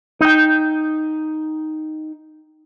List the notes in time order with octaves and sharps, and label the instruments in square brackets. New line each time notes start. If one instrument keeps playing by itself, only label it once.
[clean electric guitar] D#4 G5